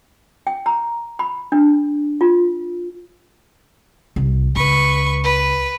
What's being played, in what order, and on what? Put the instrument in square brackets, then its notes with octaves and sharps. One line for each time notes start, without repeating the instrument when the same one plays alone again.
[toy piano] G5
A#5
B5
D4
F4
[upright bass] C2
[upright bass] C#2 [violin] B4 C#6
[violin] B4